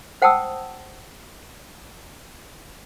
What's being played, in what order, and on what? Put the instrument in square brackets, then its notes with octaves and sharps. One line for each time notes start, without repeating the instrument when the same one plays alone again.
[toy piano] C5 F#5 G5 A5 D#6 E6